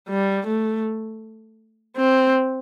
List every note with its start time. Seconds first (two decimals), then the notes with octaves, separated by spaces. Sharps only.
0.09 G3
0.47 A3
1.97 C4